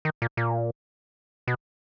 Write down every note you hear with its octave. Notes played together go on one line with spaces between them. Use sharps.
D#3
A#2
A#2
B2